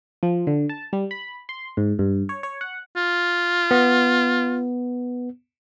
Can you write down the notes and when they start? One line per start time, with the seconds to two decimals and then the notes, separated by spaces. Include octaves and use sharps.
0.23 F3
0.47 D3
0.69 A5
0.93 G3
1.11 B5
1.49 C6
1.77 G#2
1.99 G2
2.29 C#5
2.43 C#5
2.61 F#5
2.96 F4
3.71 B3